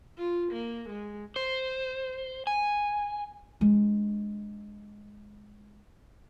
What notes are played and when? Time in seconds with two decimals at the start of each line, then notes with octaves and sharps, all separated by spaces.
0.18 F4
0.52 A#3
0.89 G#3
1.36 C5
2.47 G#5
3.61 G#3 D4